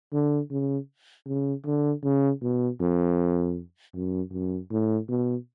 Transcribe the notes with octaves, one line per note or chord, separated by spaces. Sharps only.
D3
C#3
C#3
D3
C#3
B2
F2
F#2
F#2
A2
B2